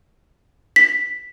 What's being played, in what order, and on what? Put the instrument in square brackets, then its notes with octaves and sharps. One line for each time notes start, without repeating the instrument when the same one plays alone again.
[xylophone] B6